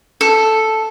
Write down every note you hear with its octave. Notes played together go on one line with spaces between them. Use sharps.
A4